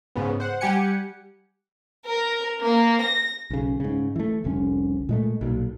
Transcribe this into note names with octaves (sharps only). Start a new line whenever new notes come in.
G#2 C#3 B3
C5 F#5
G3 G4 F#5 G#5 C#7
A#4
A#3
A#6
B1 C#3
G#2 C#3
E3 A3
F1 C2 D3 C#4
A#2 G#3 A3
B1 A#2